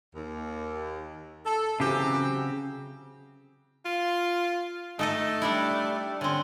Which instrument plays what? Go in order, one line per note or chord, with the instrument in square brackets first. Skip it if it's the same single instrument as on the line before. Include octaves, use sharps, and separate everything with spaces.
[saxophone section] D#2
A4
[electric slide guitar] C#3 C4 [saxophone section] E3 F#3 G4
[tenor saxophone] F4
[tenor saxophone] A3 [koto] D#4 A4 D#5
[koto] G3 D4 E4
[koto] D3 C4 [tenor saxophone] C#4